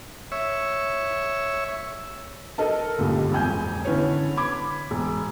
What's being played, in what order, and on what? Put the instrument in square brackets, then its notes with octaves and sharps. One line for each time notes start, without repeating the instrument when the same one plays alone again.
[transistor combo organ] C#5 E5
[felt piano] A4 A#4 D#5 A5
C#2 G2 A#2 D3
E1 F2 G#5 G6
D3 B3 C#4 E4 B4 C#5
B5 D6 G#6
E1